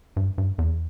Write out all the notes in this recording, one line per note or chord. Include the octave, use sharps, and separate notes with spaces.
G2
G2
E2